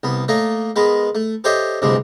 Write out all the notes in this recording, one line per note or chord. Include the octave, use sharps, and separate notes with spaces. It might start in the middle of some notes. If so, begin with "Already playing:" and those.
C2 B3
A3 A#3 C#5 D#5
G#3 B3 A#4 B4
A3
G4 A4 C5 C#5 D#5 E5
D2 G2 C3 E3 G#3